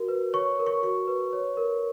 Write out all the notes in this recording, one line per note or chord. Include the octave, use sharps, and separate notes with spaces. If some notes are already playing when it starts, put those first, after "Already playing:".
Already playing: F#4 A#4
B4
C#5 C#6
A#4
C#6
F#4 C#6
B4
C#5
A#4